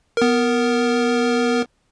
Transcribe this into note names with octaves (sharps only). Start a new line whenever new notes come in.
B3 A#4